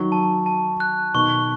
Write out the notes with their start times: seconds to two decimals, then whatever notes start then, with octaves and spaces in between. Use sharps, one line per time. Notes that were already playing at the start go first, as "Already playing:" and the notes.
Already playing: D#3 F#3 C#6
0.12 A5
0.46 A5
0.80 F#6
1.14 B2 D#3 C#6